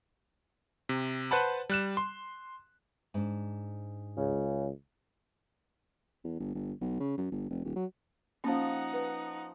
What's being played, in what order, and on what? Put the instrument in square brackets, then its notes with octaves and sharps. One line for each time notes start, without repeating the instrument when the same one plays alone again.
[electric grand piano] C3
B4 C5 F#5 A5 B5
G3 F#6 E7
C6
[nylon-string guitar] G#2 D4
[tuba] C#2 [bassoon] C#3
[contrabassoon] E2
G1
G1
B1
C#3
F#2
G1
F1
D#1
F#3
[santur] F3 A5 [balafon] A#3 C#4 [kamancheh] D#4 F#5
[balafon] B4